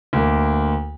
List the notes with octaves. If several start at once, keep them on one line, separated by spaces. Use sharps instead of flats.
D2 A#3